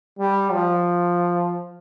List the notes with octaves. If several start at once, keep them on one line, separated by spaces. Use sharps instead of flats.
G3
F3